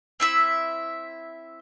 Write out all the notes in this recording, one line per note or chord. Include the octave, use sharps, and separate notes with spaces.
C4 E4 E5